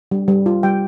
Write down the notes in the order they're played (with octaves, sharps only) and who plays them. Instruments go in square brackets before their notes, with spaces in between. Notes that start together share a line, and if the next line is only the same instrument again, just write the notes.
[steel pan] G3
G3
F4
G3 G5